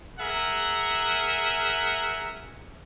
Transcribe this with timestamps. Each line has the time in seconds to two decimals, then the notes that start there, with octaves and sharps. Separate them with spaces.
0.19 G#4 A#4 E5 F#5